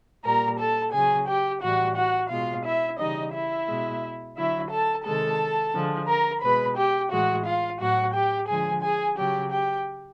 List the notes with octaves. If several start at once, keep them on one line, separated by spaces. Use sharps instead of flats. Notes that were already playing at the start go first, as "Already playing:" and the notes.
A#2 G3 A#4 A#5
A4 A5
C#3 F#3 G#4 G#5
G4 G5
A2 E3 G3 F#4 F#5
F#4 F#5
B2 G#3 F4 F5
E4 E5
C#3 E3 G3 D#4 D#5
E4 E5
B2 G#3
D3 F#3 E4 E5
A4 A5
C3 D#3 G#3 A4 A5
D3 F3 G#3
A#4 A#5
B2 G#3 B4 B5
G4 G5
A2 E3 G#3 F#4 F#5
F4 F5
A2 F#3 F#4 F#5
G4 G5
D3 F3 G#3 G#4 G#5
G#4 G#5
C#3 F#3 G4 G5
G4 G5